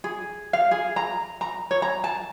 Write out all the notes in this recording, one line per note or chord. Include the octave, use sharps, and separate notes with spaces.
G#4
F5
G#4
A#5
A#5
C#5
A#5
A5